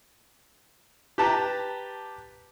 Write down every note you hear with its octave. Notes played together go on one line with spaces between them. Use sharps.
G4 B4 A5 A#5